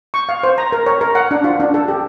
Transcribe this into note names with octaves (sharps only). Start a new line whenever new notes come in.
C#6
F5
C5
A#5
A#4
C#5
A#4
F#5
D4
F4
D4
A4
G4